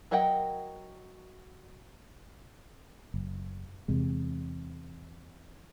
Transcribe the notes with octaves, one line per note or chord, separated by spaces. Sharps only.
F#3 A#4 D#5 F#5 G5
F#1
E2 C3 G#3